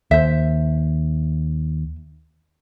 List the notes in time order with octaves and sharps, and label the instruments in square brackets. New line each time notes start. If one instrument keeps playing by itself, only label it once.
[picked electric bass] D#2 [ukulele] C5 E5